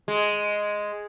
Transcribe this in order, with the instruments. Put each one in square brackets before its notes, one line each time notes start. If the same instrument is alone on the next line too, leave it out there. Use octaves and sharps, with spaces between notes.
[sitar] G#3